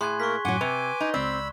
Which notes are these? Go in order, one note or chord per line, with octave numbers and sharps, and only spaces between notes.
A2 G#4 G#5 C6 F#6 G#6
A#3 A#4 C#6 B6
F#2 A2 F#3 F#4 F#5 G#5 D6 G7
C3 B4
D#4
C#2 C4 D5 B5 E6